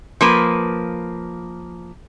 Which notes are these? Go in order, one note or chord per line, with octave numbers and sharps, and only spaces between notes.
F3 A#3 B4